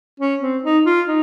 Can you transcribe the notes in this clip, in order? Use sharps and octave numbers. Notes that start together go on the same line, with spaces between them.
C#4
C4
D#4
F4
D#4